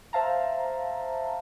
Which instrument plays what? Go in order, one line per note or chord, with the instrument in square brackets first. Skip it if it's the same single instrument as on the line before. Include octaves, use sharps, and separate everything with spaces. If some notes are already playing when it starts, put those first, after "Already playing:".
[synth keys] C5 E5 F5 A5 A#5